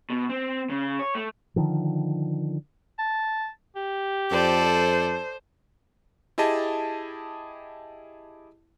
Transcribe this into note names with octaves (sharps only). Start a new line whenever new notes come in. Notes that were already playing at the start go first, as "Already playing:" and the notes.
B2
C4
C#3
C#5
A3
D3 D#3 F3
A5
G4
F2 A4 C5 D5
E4 G4 G#4 D#5 A5